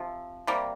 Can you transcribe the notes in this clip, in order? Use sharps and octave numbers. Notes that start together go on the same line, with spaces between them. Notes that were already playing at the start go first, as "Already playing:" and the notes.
Already playing: C3 F3
C3 G3 A#3